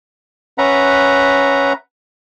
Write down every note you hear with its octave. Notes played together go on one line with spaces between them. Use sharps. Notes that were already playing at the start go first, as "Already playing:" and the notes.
C#4 B4 E5 F#5 A#5